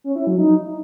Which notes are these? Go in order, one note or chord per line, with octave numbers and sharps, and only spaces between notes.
C#4
E4
F#3
D#4